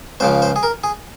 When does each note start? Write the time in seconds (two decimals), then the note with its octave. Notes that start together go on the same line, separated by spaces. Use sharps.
0.20 C#2 C#3 F3 C5
0.42 C5
0.56 G#4
0.63 A#4
0.84 G#4